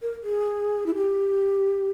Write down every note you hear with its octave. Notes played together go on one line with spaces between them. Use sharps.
A#4
G#4
E4
G4